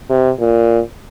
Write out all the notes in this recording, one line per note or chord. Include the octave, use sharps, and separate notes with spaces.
C3
A#2